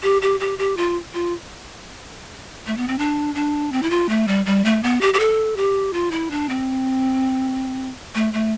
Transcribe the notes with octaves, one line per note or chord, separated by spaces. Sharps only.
G4
G4
G4
G4
F4
F4
A3
B3
C4
D4
D4
C4
E4
F4
A3
G3
G3
A3
B3
G4
G4
A4
G4
F4
E4
D4
C4
A3
A3